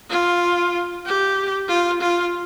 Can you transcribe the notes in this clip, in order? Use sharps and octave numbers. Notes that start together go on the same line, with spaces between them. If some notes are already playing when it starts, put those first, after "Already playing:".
F4
G4
F4
F4